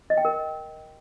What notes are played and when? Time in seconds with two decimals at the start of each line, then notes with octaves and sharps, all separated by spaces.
0.10 D#5
0.17 G5
0.25 A#4